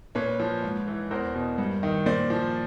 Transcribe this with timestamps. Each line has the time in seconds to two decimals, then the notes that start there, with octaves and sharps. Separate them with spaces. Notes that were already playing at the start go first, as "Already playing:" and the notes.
0.15 A#2 B4 C#5
0.40 F3
0.63 G#2
0.87 E3
1.11 E2 A#4 C5
1.35 B2
1.58 G2
1.83 D#3
2.06 A#2 C5 D5
2.30 F3